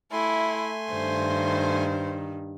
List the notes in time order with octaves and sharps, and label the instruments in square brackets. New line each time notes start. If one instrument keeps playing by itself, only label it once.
[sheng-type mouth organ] A3 G#5 C6 [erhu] E4
[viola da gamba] G2 D#3 [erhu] C5